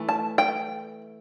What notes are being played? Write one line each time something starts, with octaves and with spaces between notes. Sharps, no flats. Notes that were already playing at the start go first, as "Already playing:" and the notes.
Already playing: E3 A3
A5
G5